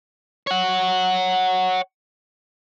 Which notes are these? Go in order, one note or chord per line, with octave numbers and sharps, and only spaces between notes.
C#5 F#5